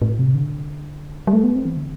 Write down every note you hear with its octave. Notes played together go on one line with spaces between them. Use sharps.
A2
C3
D3
G3
A3
B3
C4
E3
D3